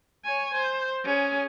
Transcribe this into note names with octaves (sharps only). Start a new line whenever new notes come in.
C#5 G#5
C5
C#4 G#4